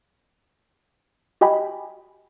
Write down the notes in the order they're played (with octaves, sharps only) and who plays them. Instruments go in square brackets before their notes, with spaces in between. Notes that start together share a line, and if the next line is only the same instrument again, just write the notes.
[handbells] F#4 G4 D#5 G5 G#5 B5